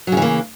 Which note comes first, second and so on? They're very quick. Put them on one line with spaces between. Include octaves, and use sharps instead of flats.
F#3 C#3 E3 A#3